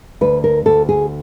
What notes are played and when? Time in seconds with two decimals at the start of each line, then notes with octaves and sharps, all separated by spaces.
0.21 D2 B4
0.44 A#4
0.66 D2 A4
0.89 G#4